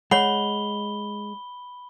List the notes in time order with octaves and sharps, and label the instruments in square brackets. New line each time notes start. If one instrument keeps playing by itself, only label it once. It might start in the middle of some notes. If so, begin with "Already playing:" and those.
[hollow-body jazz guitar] G#3 [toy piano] C#5 F#5 [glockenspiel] B5 G7